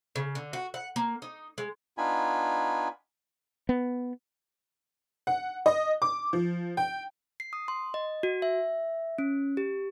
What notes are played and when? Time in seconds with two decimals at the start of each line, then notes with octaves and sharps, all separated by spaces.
0.16 C#3
0.35 D3
0.53 F#4
0.74 F#5
0.96 A#3
1.22 D#4
1.58 G#3
1.98 B3 D4 D#4 F4 G#5 B5
3.69 B3
5.27 F#5
5.66 D#5
6.02 D6
6.33 F3
6.77 G5
7.40 C7
7.53 D#6
7.68 C6
7.94 D#5
8.23 F#4
8.42 E5
9.18 C#4
9.57 G4